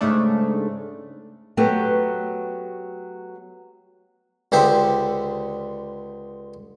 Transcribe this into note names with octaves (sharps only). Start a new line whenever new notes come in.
G#2 C#3 A3 D4
F#3 A3 B3 G4
C#2 D3 G4 C5 E5